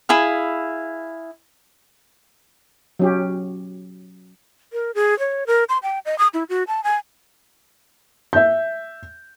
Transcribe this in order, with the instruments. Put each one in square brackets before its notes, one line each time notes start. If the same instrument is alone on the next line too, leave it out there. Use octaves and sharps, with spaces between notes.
[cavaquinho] E4 G#4 F5
[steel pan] F#3 C#4 G4
[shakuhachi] A#4
G#4
C#5
A#4
C6
G5
D#5
D#6
E4
F#4
A5
G#5
[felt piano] E5 G6